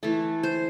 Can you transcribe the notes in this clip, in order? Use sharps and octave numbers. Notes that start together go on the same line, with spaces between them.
E3 A3 A4
C5